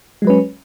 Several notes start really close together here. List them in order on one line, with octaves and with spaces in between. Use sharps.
G#3 F#3 B4 C#4